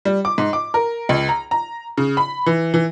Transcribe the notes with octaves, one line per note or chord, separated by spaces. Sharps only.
G3
D6
G#2
D6
A#4
C#2
A#5
A#5
C#3
B5
E3
E3